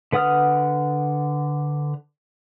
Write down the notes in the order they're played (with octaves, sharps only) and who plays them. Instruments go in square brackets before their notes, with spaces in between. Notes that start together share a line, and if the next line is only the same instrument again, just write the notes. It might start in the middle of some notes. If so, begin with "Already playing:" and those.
[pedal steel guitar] D3 B4 F#5 D#6 F6